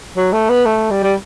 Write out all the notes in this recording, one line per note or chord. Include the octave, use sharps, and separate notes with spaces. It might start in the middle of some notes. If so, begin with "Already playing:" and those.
F#3
A3
B3
A3
G3
G3